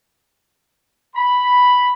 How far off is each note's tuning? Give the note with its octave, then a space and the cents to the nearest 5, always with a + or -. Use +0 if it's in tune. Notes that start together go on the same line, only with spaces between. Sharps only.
B5 +0